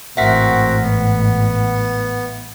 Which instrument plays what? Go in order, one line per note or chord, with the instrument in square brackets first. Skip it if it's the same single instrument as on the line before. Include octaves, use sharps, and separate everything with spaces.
[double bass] A1 G#2 [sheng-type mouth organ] C4 F#4 A#4 [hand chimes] E5 F#5 B6
[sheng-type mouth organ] B3